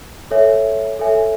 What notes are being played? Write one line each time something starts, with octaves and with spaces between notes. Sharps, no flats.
A4 C#5 E5 G#5
A4 C#5 E5 G#5